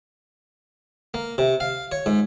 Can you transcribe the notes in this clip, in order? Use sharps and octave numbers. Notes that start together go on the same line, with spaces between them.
A#3
C3
F5
C#5
G#2